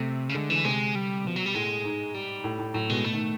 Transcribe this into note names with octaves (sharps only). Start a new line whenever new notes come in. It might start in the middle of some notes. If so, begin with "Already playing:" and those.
Already playing: C3 A3
C#3
D3 G#3
D3 E3
C3 G#3
G3
B2 F3
F#3
G3
A2 G#3
G#2
G3
A2
A2
A2 F#3
B2 G#3
B2 A3
D#3